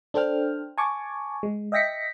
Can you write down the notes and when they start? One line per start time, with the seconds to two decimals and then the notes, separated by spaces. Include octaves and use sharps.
0.14 D4 A4 C5 G5 F6
0.78 G#5 A5 C#6 D6
1.43 G#3
1.72 D#5 E5 G5 A#6 B6 C#7